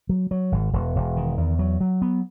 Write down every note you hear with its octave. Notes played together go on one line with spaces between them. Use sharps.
F#3
F#3
G#1
E1
E1
D#3
E2
F#3
F#3
B3